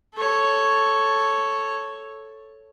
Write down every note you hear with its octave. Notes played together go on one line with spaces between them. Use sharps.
A4 C#5